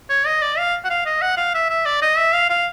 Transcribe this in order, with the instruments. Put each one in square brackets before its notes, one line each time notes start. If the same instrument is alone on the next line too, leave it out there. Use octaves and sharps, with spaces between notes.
[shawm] C#5
D#5
D5
F5
F#5
F5
D#5
F#5
F5
E5
E5
D5
D#5
E5
F5
F5